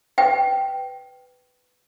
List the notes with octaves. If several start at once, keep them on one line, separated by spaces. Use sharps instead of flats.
B4 G5